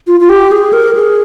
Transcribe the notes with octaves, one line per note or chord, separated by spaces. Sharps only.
F4
F4
G4
G#4
A#4
G#4